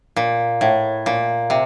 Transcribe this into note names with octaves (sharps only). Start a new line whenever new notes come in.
A#2
A2
A#2
C3